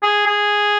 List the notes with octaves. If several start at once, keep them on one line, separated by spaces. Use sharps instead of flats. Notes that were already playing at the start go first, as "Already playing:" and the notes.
G#4
G#4